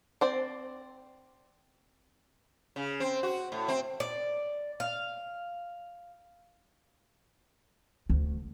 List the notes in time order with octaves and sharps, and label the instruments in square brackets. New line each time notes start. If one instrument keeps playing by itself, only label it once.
[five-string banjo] C4 C5 D5
[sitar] C#3
C4
F#4
A2
C4
[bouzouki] D5
F5
[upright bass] D2